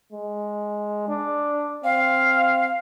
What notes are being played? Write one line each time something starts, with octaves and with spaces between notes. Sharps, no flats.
G#3
D4
C4 F5